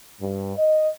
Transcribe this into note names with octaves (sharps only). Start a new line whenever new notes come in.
G2
D#5